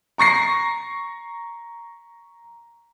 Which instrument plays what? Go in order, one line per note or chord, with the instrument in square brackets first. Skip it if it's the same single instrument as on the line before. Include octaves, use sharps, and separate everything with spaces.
[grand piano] A#5 C#6 A#6 C7